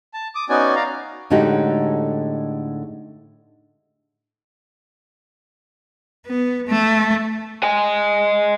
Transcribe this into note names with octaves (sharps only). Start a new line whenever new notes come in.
A5
D6 D#6
B3 C#4 D#4 F#4 D5 G#5
D5 F5 A#5
A2 D3 G#3 D#4 F#4 G4
B3
A3
D#5 G#5